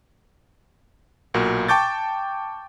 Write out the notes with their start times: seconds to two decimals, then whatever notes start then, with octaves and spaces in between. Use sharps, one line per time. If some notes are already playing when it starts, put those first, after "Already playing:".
1.34 B1 A#2 F#4 A#4
1.68 G5 A5 C#6 D6 G6 A6